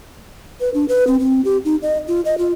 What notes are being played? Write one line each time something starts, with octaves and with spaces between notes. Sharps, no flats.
B4
D4
B4
C4
C4
G4
D#4
D#5
F4
D#5
F4